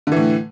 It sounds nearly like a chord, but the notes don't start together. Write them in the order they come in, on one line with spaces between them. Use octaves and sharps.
D3 E3 A2